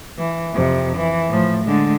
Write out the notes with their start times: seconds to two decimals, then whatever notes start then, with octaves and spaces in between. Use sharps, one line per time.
0.19 E3
0.54 F2 C3
0.97 E3
1.29 A2 F3
1.65 D3 G#3